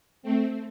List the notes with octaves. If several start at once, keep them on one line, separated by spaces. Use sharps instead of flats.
A3 C4